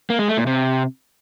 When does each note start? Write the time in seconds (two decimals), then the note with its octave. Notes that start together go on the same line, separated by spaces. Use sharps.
0.10 A#3
0.19 G#3
0.28 A3
0.37 A#2
0.47 C3